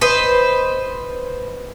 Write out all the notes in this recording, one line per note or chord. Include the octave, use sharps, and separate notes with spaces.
B4 C5 D#5